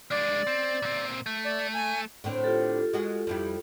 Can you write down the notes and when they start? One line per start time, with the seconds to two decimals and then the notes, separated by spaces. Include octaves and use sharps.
0.11 G#3 D4 D5
0.47 C4
0.82 A#2 C4
1.26 A3
1.45 D5
1.74 G#5
2.24 A2 D3 C4
2.44 F4 G4 A4
2.93 G#3 F#4 G#4
3.27 F2 G3 E4